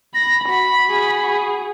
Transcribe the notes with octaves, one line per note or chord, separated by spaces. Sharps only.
B5 A#6
F#4 B5
F#4 G#4